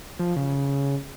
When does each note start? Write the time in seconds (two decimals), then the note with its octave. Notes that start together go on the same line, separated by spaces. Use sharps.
0.19 F3
0.36 C#3